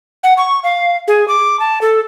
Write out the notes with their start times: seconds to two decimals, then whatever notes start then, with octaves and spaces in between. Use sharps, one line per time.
0.23 F#5
0.37 C#6
0.64 F5
1.08 G#4
1.28 D6
1.60 A5
1.81 A4